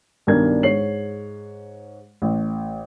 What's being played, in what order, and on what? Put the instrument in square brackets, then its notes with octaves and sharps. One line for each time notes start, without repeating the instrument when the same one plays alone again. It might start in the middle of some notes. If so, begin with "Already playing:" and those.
[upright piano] B1 G2 D#3 D4 A#4 G#6
G#2 C#5 C7 F#7
A1